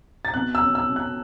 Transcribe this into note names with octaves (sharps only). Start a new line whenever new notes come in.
A6
B2 F#6
E6
C#4
E6
B2
F#6